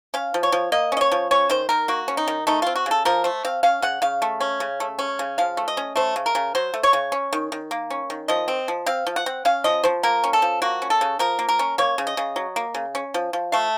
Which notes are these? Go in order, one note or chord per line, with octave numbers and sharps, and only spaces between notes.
C#4 F5
F3
C#5
F3
A#3 D#5
C#4 D#5
C#5
F3
C#4 C#5
D#3 C5
D#3 A#4
A#3 F#4
C#4
D#4
D#3
A3 D#4
C4 F4
F#4
C#3 A4
F3 A#4
A3 C5
C4 F5
C#4 F5
C#3 F#5
C#3 F5
A3
C#4
C#3
A3
C#4
C#3
F3 F5
A3
D#5
C#4
A3 C5
C#3
A#4
C#3
F#3 C5
A3
C#5
C#3
C#4
D#3
D#3
A#3
C#4
D#3
F3 D#5
C4
F3
C4 F5
F3
F#5
C4
C#4 F5
F3 D#5
F3 C5
A#3 A#4
C#4
A4
F3
A#3 F#4
C#4
A4
C#3
F3 A#4
A#3
A#4
C#4
A#3 C#5
C#3
D#5
C#3
F#3
A#3
C#3
C#4
F3
F3
A3 F5